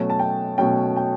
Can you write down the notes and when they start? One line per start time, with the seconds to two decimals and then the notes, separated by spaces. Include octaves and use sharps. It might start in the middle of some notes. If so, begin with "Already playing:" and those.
Already playing: B2 F#3 A3 C#4
0.10 A5
0.19 G5
0.58 B2 F#3 A3 C#4 G5
0.96 G5